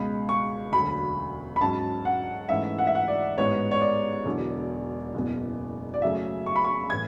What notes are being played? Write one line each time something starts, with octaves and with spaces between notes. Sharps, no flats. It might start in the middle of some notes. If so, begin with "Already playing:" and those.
Already playing: C#2 B2 G#3 B5
C#6
E1 D2 D3 F#3 B5
B5
G#2 F#3 C#4 A5
F#5
G#2 E3 A3 C#4 E5
F#5
E5
F#5
D5
A1 G#2 G#3 B3 C#5
C#5
D5
E1 E2 D3 F#3
F#1 E2 B2
D5
F#2 C#3 F#3 A3 C#4 E5
C#6
B5
C#6
A2 E3 G#6